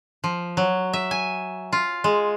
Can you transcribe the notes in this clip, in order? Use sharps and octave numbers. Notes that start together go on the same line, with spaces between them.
F3
F#3
E5
G#5
F4
G#3